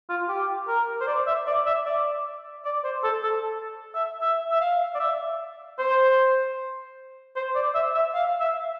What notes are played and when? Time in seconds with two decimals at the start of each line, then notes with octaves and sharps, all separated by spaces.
0.09 F4
0.29 G4
0.68 A#4
1.01 C5
1.07 D5
1.27 E5
1.47 D5
1.66 E5
1.86 D5
2.65 D5
2.84 C5
3.04 A4
3.23 A4
3.95 E5
4.21 E5
4.51 E5
4.61 F5
4.95 D5
5.00 E5
5.79 C5
7.36 C5
7.55 D5
7.75 E5
7.94 E5
8.14 F5
8.40 E5